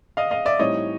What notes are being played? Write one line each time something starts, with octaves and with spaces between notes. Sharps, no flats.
D#5 F5
D#5 F5
D5 E5
A2 E3 G3 C4 D#4 C#5 D#5